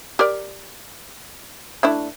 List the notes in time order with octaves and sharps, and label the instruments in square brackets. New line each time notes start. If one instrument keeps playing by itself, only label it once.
[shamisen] G4 A#4 D5
A3 D4 E4